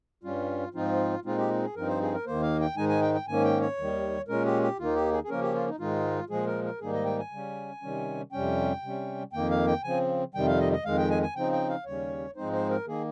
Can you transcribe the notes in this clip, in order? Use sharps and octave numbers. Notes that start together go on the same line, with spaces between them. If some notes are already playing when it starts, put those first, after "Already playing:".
G2 G3 C#4 F4
G#2 F3 C4 D#4 F4
A#2 G#3 C4 D#4 F4
G4
G#4
G2 F3 C4 D#4 A#4
C5
G#4
A#4
D#2 D#3 A#3 C5
F5
G5
G#2 D#3 G#3 D#4 G#5
G#5
G5
G5
G#2 D#3 A#3 C#4 G#5
G5
C#5
D#2 D#3 G3
A#2 G#3 C#4 A#4
G4
G4
D#2 D#3 A#3 D#4 F4
G4
G#4
G#4
C#3 F3 A#3 C#4 A#4
G4
F4
D#4
G#2 D#3 G#3 D#4 F4
A#2 F3 G#3 G#4
A#4
A#4
G#2 D#3 G3 A#3 D#4 G#4
D#5
G5
G#5
C#3 G3 C#4
C3 D#3 G3 C#4
F2 C3 G3 C#4 G5
C3 G3 C#4
F2 D#3 A#3 G5
F5
G5
C#3 F3 C4 G#5
F2 C3 D#3 G3 G5
F5
D#5
D#5
F2 D#3 G#3 F5
G5
G#5
G#5
C#3 F3 C4 D#4 G5
G5
F5
D#2 C#3 G3 C#4 C#5
G#2 F3 G#3 C4 D#4 C5
C5
A#4
D#3 A#3 G#4